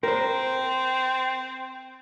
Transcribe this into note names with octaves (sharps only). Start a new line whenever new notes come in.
C4 A#4 C5